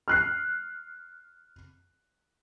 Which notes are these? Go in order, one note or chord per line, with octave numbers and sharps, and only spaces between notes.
F6 F#6 C7